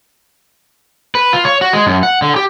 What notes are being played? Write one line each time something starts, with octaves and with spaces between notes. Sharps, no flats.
B4
F4
C#5
F#4
G#3
F#2
F#5
D3
G4